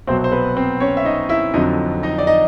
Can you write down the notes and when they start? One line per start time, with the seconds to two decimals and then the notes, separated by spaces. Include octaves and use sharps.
0.07 C2 B2 F#3 C4 C5
0.24 C5
0.32 B3 B4
0.56 C4 C5
0.80 C#4 C#5
0.97 E5
1.05 D#4 D#5
1.29 E4 E5
1.53 F2 D3 F#3 D#4 D#5
2.03 D#4 D#5
2.18 D5
2.27 D#4 D#5